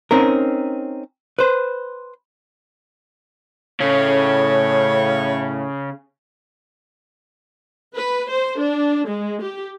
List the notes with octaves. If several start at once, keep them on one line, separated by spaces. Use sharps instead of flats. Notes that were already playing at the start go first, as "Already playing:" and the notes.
C4 C#4 D#4 A#4
B4 C5
A2 C#3 C#5
B4
C5
D4
G#3
G4